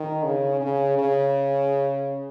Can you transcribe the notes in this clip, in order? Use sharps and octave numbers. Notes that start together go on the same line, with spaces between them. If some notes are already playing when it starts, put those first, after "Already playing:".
Already playing: D#3
C#3
C#3
C#3